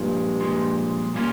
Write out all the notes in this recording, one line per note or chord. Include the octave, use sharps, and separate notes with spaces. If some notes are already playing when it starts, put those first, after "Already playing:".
Already playing: G2 A#2 F3 G#3
A#2 F3 G#3
A#2 G3 A#3 C#4 F4